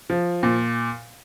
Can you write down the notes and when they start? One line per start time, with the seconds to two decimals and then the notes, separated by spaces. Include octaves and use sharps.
0.10 F3
0.43 A#2